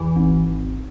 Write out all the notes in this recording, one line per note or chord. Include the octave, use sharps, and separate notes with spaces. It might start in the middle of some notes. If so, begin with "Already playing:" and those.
Already playing: E2 E3
G#1